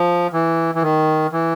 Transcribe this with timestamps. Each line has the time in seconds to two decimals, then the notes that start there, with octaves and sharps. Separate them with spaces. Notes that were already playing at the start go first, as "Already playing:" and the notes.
Already playing: F3
0.33 E3
0.75 E3
0.82 D#3
1.32 E3